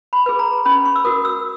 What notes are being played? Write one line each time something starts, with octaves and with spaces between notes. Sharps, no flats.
B5
G#4 B4
A#5
C#4 B5
C#6
E6
F#4 A#4 D#6
E6